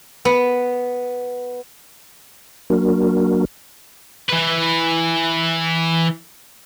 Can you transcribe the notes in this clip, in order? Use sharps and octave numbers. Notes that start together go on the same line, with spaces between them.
B3
F#3 A#3 D4 F#4 A#4
E3 B4